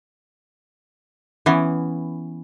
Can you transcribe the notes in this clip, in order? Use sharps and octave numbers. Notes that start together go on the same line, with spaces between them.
E3 B3 C#4